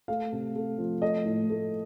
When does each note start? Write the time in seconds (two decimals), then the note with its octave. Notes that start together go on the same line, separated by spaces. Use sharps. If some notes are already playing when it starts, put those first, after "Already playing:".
0.08 A3 F5
0.32 C3
0.56 A3
0.78 F3
1.02 A3 D#5
1.25 A2
1.50 A3